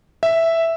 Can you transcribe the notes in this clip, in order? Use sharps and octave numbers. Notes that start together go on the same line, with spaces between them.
E5